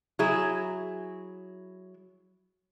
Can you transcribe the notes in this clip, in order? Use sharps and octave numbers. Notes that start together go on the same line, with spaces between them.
F#3 E4 G#4 E5